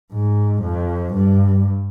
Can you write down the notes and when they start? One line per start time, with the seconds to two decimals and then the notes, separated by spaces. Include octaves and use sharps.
0.13 G#2
0.63 F2
1.14 G2